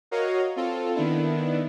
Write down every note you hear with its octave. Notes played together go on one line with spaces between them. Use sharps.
F#4 A#4 C#5 D#5 F5
C4 F4 A4
D#3 B3 D4 E4